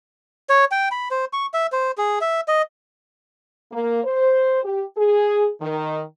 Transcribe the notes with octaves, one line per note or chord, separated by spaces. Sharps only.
C#5
G5
B5
C5
C#6
E5
C5
G#4
E5
D#5
A#3
C5
G4
G#4
D#3